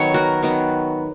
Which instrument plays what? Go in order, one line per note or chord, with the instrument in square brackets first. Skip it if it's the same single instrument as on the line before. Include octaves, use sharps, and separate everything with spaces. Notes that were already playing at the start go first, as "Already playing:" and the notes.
Already playing: [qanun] D#3 F#3 B3 C#5
F#4 A#4
D#3 F#3 B3